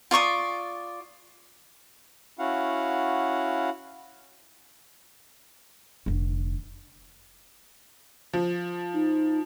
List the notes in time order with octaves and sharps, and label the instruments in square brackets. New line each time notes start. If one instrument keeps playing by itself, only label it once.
[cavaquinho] F4 D5 C#6 D#6
[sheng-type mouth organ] C#4 E4 F#4 F5 F#5
[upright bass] F1 D3
[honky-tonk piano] F3
[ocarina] D#4